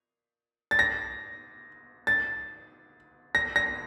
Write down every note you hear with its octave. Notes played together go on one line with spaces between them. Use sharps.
A6
A#6
A6
A#6
A#6